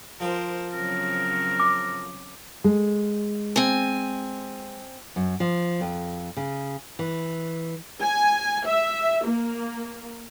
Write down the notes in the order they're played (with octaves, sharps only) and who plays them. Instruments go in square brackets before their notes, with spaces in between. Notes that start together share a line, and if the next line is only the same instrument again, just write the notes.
[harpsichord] F3 G5 [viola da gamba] A#4 C5
[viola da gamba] C#3 F#3 C4 [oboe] A#4
[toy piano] D6
[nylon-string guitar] G#3
[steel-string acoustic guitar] C4 G#5
[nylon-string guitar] F#2
F3
F2
C#3
E3
[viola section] G#5
E5
A#3